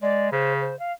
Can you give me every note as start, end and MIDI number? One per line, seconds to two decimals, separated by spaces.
0.02 0.29 56
0.02 0.31 74
0.32 0.72 49
0.32 0.53 72
0.61 0.78 72
0.79 0.92 77